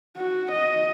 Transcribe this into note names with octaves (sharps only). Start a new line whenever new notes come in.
F#4
D#5